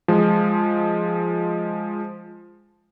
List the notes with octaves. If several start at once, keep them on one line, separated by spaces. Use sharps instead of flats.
F3 G#3